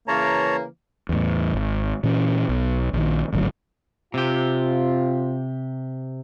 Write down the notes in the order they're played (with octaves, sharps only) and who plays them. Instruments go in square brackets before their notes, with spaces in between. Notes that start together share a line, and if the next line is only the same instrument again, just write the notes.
[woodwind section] C#3 E3 A#3 [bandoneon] C#5 A5 A#5
[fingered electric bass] E2 A2
G#1
A#2 E3 C#4
B1
A#1 D#3
D1 G#1 D2 F#3
[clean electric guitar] C3 G4 [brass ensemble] C4 F4